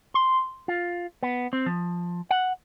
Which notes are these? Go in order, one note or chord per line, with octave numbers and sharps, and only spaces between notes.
C6
F4
B3
C4
F3
F#5